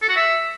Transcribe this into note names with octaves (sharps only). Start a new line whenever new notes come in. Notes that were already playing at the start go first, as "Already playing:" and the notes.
A4
F#4
E5